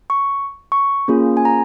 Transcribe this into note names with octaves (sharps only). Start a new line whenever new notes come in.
C#6
C#6
A#3 C#4 F4 G#4
G#5
A#5